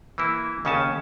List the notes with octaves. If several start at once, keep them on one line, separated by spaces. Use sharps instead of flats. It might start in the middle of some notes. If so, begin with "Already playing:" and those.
E3 A#3 E4
D#2 C#3 C#4 G#5 A5